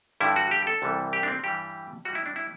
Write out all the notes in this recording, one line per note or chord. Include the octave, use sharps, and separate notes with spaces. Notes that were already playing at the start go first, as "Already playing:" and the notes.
G2 D3 G3 E4
F#4
G4
A4
C2 C3 E3 G3
G4
D4
C4
G2 E3 G3 G4
A2 G3 F#4
E4
D4
E4